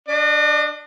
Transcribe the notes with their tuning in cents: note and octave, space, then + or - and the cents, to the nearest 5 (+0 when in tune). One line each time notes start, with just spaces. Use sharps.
D4 +0 D#5 -45